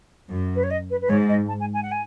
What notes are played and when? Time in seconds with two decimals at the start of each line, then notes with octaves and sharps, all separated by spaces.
0.31 F#2
0.55 B4
0.63 C#5
0.70 D#5
0.90 B4
1.01 B4
1.09 G#2 C#5
1.28 D#5
1.48 A5
1.60 G#5
1.73 G#5
1.82 F#5
1.91 G#5